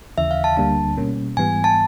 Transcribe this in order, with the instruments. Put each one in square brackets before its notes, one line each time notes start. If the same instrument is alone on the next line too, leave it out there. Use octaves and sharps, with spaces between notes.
[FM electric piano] D#2 C#3 E3 [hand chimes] E5
[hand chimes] F5
A5
[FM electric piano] D2 D3 G3 A#3 D4 [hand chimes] A5
[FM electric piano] B2 G3 A#3 C#4
[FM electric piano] G#2 E3 G3 B3 [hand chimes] G#5
[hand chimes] A5